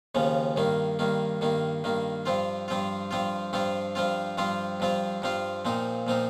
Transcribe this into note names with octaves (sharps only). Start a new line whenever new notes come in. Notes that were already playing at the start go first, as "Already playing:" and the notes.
D#2 C#3 F3
G2 D#3 A#3
G2 D#3 A#3
G2 D#3 A#3
G2 D#3 A#3
G2 F3 C4 F4
G2 F3 C4 F4
G2 F3 C4 F4
G2 F3 C4 F4
G2 F3 C4 F4
G2 F3 C4 F4
G2 F3 C4 F4
G2 F3 C4 F4
A#2 F3 C4 D#4
A#2 F3 C4 D#4